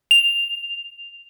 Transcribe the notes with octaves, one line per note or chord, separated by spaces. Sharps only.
F7